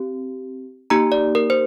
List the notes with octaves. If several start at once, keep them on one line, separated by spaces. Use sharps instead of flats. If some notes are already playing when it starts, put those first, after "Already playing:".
Already playing: C4 G4
A#3 D#4 G4 A#5
D5
A#4
C5